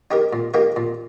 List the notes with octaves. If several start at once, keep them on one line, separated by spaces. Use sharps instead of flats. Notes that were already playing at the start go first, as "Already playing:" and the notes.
D#4 G4 A#4
A#2
A#3 D#4 G4 A#4
A#2